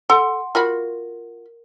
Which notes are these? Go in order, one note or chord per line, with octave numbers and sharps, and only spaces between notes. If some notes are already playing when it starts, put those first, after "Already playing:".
A4 F#5 C6
F4 F#4 A#4 B5